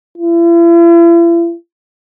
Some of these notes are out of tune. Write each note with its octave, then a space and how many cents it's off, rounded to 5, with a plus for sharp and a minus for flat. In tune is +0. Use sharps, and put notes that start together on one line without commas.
E4 +45